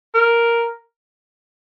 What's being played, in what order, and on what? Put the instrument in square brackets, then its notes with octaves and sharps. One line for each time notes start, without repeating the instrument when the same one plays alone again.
[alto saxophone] A#4